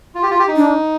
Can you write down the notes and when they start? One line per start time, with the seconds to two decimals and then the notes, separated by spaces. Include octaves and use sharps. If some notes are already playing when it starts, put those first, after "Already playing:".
0.15 F4
0.23 G4
0.31 F4
0.39 G4
0.48 D#4
0.56 D4